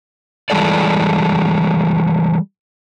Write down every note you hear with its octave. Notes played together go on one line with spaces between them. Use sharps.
E3 G3 G#3 A4 D5